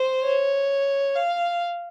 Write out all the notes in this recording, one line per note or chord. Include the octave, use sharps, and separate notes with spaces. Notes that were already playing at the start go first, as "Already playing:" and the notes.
Already playing: C5
C#5
F5